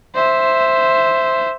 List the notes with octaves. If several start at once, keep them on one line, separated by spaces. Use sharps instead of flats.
C5 E5